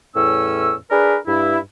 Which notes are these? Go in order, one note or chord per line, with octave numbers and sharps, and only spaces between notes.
E2 A2 C#4 E6
D4 G#4 A#4 B4
G2 E4